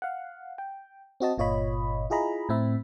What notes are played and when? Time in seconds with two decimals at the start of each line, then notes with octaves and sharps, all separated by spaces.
0.02 F5 F#5
0.58 G5
1.20 C4 F#4 D#5 A5
1.38 G1 A#2 F4 C#5 D#5 B5
2.10 E4 F4 G#4 D#5 A#5 B5
2.49 A2 C4 E5 B5